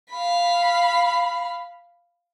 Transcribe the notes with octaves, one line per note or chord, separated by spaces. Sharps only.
F5 B5